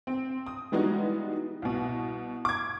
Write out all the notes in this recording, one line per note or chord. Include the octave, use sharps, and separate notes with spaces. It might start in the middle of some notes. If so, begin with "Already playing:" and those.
C4
D#6
E3 G3 G#3 B3 D#4 F#4
C2 B2
D6 G#6